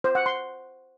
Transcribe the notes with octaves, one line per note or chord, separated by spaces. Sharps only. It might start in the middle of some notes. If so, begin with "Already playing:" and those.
C5
F#5
C6